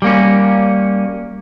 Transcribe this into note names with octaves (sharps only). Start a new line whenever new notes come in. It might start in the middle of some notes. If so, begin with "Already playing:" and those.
G3 A#3 C#4